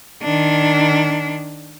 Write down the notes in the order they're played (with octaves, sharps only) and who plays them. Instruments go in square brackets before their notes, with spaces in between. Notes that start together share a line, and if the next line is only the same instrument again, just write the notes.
[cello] D#3 D4